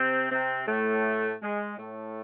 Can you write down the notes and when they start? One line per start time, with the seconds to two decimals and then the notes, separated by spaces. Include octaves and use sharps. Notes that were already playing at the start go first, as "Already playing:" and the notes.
Already playing: C3 C4
0.30 C3 C4
0.67 A2 A3
1.42 G#3
1.78 A2 A3